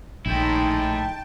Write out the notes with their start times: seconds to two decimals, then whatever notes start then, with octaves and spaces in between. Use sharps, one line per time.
0.26 A#1 A2 D#3 G#3 D#4 E4 G5 A5